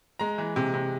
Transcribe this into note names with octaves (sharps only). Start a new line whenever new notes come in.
G#3 A#5
E3
C3
C3